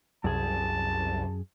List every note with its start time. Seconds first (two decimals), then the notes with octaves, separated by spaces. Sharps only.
0.24 C2 F#2 G#4 G#5 A5